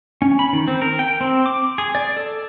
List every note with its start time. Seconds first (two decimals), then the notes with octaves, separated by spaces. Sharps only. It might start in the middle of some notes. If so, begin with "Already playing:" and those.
0.22 C#4
0.39 B5
0.53 D#3
0.68 C4
0.82 A#4
0.99 G5
1.21 C4
1.46 D6
1.78 G#4
1.95 D5
2.17 A4